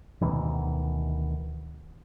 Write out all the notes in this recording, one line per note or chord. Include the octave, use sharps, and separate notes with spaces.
D2 B2 D#3 E3